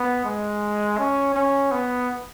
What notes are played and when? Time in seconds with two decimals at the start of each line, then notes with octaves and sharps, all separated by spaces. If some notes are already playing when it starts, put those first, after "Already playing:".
Already playing: B3
0.25 G#3
0.98 C#4
1.35 C#4
1.72 B3